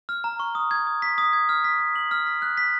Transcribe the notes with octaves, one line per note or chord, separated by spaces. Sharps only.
F6
A#5
C#6
D#6
G#6
D#6
B6
D#6
G#6
F6
B6
F6
F#7
F6
B6
F#6
B6